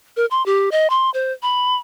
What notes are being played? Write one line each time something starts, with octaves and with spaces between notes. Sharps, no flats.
A#4
C6
G4
D#5
C6
C5
B5